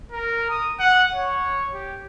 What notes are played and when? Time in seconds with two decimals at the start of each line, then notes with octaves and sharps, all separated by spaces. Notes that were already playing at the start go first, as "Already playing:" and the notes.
0.12 A#4
0.50 D#6
0.79 F#5
1.14 C#5
1.74 G4